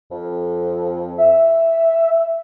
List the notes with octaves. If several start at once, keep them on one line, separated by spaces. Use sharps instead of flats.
F2
E5